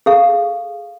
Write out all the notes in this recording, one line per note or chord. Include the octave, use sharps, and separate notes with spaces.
G#4 A4 F5